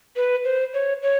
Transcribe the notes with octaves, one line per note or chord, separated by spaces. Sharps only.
B4
C5
C#5
C#5